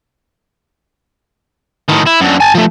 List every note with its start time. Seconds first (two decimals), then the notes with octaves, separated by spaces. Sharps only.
1.89 A2 D#3
2.07 E4
2.21 F#2 D3
2.40 G#5 A5
2.55 F3 A3